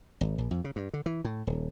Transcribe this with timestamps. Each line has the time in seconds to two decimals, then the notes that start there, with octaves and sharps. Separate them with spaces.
0.21 G#1
0.38 A#1
0.51 F2
0.64 C#3
0.76 G2
0.93 D3
1.06 E3
1.25 A2
1.47 D#1